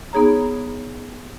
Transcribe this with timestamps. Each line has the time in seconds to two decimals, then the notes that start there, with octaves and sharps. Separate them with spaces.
0.13 B3 D#4 G#4 C#5 A#5